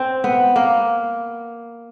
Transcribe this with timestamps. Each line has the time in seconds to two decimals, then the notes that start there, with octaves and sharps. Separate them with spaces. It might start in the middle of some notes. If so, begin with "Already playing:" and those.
Already playing: C4
0.24 B3
0.56 A#3